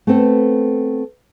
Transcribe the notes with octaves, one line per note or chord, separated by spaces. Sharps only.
A3 B3 C4 A4